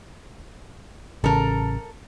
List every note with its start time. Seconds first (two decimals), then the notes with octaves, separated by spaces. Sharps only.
1.24 A1 C#3 A4 A#4